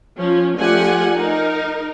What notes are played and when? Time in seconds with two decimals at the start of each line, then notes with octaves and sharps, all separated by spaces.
0.17 F3 C#4
0.58 F3 A3 G4 D5 F#5 G#5
1.15 D#4 A#4